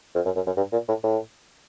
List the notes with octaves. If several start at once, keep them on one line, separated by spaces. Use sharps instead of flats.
F2
F#2
F#2
F#2
G2
A#2
A2
A2